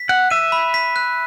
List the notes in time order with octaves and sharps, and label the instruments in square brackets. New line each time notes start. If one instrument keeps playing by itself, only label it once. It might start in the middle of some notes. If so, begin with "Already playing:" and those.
Already playing: [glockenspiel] B6
[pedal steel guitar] F#5 [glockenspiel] F#6
[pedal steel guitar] E5 [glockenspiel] D#7
[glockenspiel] B5
B6
F#6